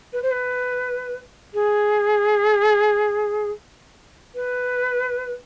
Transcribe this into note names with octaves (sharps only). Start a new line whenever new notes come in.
B4
C5
B4
G#4
B4